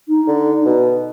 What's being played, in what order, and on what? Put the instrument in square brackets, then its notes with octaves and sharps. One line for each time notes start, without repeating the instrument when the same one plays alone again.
[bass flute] D#4
[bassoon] D3
B2